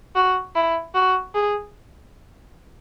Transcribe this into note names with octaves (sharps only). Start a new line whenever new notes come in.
F#4
E4
F#4
G#4